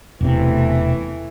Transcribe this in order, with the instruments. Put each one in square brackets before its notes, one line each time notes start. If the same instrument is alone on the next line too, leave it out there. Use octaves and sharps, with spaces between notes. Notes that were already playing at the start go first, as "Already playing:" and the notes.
[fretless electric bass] E1 C3 [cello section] E3 A3